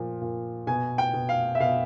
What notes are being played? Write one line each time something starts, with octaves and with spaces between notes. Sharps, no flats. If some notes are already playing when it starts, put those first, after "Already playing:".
Already playing: A#2 F3
A#2
B2 G#5
G5
B2
F5
E5
B2 F5